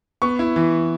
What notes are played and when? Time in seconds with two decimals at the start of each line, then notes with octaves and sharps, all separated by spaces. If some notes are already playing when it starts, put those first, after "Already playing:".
0.22 B3 C#6
0.39 E4
0.56 E3